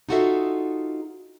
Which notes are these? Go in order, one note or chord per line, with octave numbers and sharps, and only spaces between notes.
D#4 F4 F#4 G#4 A4 E5